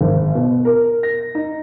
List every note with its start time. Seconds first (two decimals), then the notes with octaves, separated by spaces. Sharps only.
0.01 G#1
0.35 B2
0.65 A#4
1.03 A#6
1.35 D#4